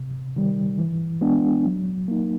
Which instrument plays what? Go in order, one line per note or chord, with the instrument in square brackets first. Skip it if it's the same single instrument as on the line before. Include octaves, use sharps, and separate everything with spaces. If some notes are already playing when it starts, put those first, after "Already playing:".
Already playing: [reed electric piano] C3
D#3 G3
E3
G#3 B3 D4
F#3
A#3 D#4